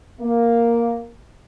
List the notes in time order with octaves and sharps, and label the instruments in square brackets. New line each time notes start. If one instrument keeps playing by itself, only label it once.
[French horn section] A#3